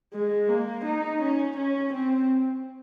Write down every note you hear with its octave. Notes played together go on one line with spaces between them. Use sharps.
G#3
A#3
D#4
C#4
C#4
C4